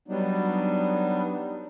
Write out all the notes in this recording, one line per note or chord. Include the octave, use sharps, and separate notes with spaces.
F#3 G3 B3 D4 D#4